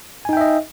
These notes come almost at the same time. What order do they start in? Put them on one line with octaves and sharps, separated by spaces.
G#5 D#4 G5 E5 D#5